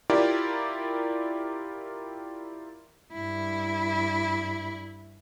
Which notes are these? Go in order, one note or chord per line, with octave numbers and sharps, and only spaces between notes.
E4 F4 G4 A#4 D5
G2 E4